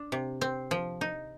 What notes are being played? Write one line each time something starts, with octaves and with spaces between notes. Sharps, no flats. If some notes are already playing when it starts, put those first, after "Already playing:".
Already playing: D4
C3
C4
F3
D#4